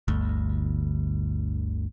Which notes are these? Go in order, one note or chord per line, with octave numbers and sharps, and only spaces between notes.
G1 D2